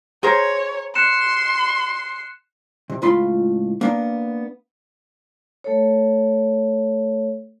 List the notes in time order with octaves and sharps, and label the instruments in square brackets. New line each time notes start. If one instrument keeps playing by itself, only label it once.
[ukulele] G#4 A#4 C5 [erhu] C#5
[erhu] C6 [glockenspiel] F#6 C#7 E7
[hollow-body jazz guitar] C3
C#2 A2 F4 B5 C6
A#3 B3 D4
[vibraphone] A3 A4 C#5